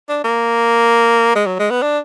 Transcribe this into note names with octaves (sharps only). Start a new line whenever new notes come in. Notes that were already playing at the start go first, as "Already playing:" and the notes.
D4
A#3
G#3
F#3
G#3
B3
D4